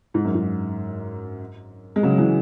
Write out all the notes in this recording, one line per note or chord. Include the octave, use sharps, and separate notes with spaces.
G#2
F#2
G#2
G#3
C#3 F#3
E3 G#3